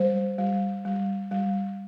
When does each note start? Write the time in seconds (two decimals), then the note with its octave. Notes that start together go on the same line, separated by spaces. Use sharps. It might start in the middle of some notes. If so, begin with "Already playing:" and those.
Already playing: G3 C5
0.38 G3
0.85 G3
1.31 G3